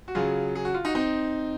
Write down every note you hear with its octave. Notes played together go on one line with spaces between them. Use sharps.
F#4
C#3 F#3 F4 G#4
G#4
F#4
F4
D#4 F#4
C4 D#4